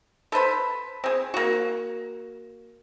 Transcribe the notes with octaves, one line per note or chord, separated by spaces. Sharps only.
A4 B4 C5 B5
C4 G#4
A#3 F#4